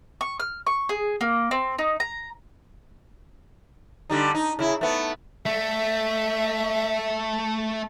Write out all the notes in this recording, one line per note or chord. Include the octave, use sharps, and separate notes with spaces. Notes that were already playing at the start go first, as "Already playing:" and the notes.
C#6
F6
C#6
G#4
A#3
C4
D#4
A#5
D3 G3 D#4
D#4
C#3 E4
A3 B3
A3 E5